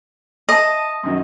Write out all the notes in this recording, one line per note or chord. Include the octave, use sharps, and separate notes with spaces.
D#5 E5 A5
F#2 D#3 F#3